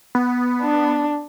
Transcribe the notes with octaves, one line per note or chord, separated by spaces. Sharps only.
B3
D4